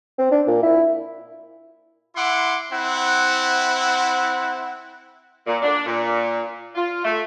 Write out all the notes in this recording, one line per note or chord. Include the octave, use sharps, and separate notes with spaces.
C4
D4
A#2
E4
E4 F#5 C6 D6
C4 E4 F#5
A#2
D4
A#2
F4
A3